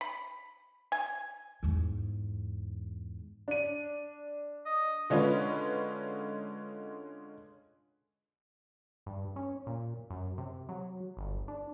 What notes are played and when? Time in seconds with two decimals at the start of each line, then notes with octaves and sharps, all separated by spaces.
0.01 B5
0.92 G#5
1.63 E2 G#2
3.48 D4 D#7
4.66 D#5
5.10 D3 G#3 C#4 F4 B4
9.06 G2
9.36 C#4
9.67 A#2
10.10 F#2
10.38 C3
10.69 F#3
11.17 G1
11.48 D4